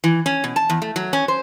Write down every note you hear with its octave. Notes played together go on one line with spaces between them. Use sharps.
E3
C#4
B2
A5
E2
A3
F#3
C#4
C5